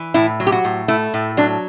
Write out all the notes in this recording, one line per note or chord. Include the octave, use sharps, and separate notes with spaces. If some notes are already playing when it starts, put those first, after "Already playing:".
Already playing: E3
A2 E4
F#3
G4
F#4
A2
A3 E4
A2
F#3 D4